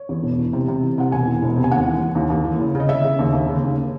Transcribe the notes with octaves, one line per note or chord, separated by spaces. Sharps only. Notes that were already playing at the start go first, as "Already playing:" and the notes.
Already playing: C#5
E2
E1
E3
C3
C3
E3
C3 F#5
E1 G#5
E3
E1
C3
G#5
D#2 F#5
E3
E3
D#2
D#2
E3
C#3
C#3 D#5
C#3 E5
C#3
D#2
D#2
C#3
D#2